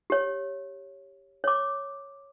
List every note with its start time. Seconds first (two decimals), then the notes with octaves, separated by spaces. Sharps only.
0.10 G4 C#5
1.44 C#5 D6